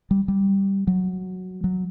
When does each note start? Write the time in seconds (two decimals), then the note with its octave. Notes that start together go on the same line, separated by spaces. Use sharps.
0.11 G3
0.28 G3
0.87 F#3
1.64 F#3